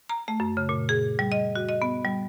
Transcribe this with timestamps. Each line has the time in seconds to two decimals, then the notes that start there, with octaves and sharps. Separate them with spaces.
0.09 A#5
0.28 A3
0.40 F#2
0.57 C#3
0.69 A#2
0.89 G#4
1.19 G3
1.32 D#5
1.55 F#4
1.69 D#5
1.82 B3
2.05 G3